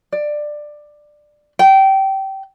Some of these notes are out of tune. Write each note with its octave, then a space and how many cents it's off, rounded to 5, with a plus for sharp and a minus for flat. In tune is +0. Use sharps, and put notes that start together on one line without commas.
D5 +15
G5 -20